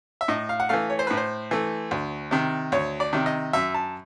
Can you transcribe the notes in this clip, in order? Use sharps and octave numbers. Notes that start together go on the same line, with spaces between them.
E5
A2 D#5
F5
F#5
E3 A3 F5
C#5
C5
A2 B4
C5
E3 A3
D2
C3 D#3
D2 C#5
D5
C3 D#3
D#5
F#2 E5
A5